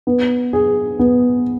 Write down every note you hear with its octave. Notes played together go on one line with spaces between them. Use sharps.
B3
G#4
B3